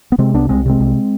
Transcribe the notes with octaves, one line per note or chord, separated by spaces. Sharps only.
B3
C3 G#3 C4
C2 B3 D4
C2 G#3 C4
C3 G#3 C4
C2